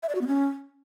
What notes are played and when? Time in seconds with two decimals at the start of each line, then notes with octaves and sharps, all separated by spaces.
0.03 E5
0.09 D5
0.15 F#4
0.21 B3
0.27 C#4